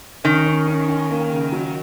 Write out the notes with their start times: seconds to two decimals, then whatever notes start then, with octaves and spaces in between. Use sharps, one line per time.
0.24 D#3 C#4
0.46 C#4
0.68 C#4
0.89 C#4
1.10 A#3
1.32 C#3
1.52 F#3